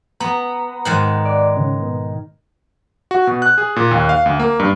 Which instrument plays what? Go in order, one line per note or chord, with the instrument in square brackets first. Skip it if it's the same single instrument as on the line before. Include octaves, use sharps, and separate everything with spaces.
[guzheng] B3 [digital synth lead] A#5
[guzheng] G#2 D#3 F#5
[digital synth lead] D5
C#3
B2
[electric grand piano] F#4
B2
F#6
G#4
A#2
D#2
F5
D2
A#3
G2